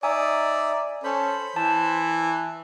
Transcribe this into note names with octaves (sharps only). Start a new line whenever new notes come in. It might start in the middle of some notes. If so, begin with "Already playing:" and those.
D#4 D5 E5 G#5 D#6
C#4 A4 C5 B5
E3 A5